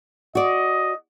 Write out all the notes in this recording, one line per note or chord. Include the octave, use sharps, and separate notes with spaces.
F#4 D5 D#5